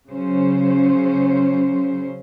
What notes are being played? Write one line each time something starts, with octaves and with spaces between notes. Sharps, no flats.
C#3 F#3 C#4 C5